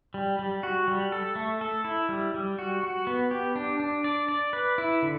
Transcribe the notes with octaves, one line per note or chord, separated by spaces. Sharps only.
G3
G3
F#4
G3
A4
A3
A4
E4
G3
G3
F#4
F#4
B3
G4
D4
D4
D5
D5
B4
E4
D3